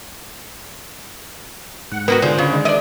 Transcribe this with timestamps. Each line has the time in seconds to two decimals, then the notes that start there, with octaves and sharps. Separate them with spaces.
1.92 G#2 F#5
2.08 A#3 B3 E4 F#4
2.22 D3 G#3 F4 C5
2.38 C#3
2.52 D#3 G#3
2.65 D4 D5 D#5